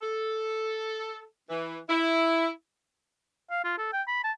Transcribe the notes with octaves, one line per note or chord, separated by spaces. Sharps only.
A4
E3
E4
F5
F4
A4
G5
B5
A5